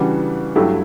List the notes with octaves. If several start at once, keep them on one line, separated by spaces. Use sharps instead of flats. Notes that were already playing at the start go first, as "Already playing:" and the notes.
Already playing: C#3 E3 G3 D4 F#4
G2 F#3 A3 E4 G4